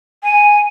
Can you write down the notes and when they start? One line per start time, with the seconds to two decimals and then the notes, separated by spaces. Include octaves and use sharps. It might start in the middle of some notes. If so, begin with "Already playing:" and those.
0.23 G#5